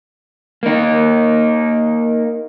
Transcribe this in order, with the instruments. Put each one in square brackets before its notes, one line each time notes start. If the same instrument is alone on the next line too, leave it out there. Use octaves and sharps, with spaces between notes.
[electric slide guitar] A#3 D#4